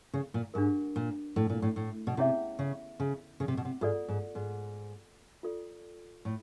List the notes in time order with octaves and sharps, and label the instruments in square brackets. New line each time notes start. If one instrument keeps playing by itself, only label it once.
[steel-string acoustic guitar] C#3
A#2
[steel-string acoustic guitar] G#2 [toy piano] D4 G4 A#4
[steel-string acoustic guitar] A#2
A2
A#2
A2
A2
B2
[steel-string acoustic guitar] C3 [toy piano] C#4 E4 G#4 C#5 E5
[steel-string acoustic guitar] C#3
C#3
C#3
C3
B2
C3
[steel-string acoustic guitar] G#2 [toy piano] F4 A4 D5
[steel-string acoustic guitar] G#2
G#2
[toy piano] F4 A4 D5
[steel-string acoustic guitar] A2